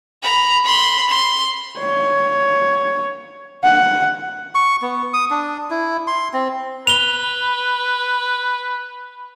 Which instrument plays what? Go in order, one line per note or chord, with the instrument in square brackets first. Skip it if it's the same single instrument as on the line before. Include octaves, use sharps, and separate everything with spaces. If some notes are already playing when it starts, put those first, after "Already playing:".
[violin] A#5 B5
B5 C6
C6
[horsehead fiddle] C#5
F#5
[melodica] C#6
B3
D#6
D4
E4
C6
C4
[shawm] B4 [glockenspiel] F7 G7